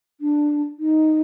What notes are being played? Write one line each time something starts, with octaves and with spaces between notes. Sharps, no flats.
D4
D#4